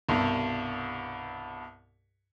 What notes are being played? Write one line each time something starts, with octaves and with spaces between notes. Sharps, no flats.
C2 G2 B2